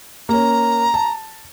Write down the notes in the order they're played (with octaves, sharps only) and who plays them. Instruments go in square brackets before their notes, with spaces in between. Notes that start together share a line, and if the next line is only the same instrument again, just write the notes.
[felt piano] A#3 C#4 [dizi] A#5
[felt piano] A5